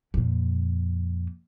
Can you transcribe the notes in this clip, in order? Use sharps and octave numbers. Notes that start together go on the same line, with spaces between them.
F2 A#2